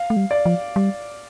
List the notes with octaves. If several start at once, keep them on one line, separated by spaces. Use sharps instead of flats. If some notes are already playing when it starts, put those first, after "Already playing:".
Already playing: F5
A3
G3
D5
F3
G3